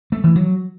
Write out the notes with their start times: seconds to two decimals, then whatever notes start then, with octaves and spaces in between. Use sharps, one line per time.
0.12 A3
0.24 E3
0.36 F#3